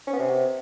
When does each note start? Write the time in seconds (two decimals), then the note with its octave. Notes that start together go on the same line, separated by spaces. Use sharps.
0.07 C#4
0.13 B3
0.19 C3